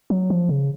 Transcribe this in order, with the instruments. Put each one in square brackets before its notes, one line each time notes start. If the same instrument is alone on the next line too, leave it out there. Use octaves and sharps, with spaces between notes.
[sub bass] F#3
F3
C#3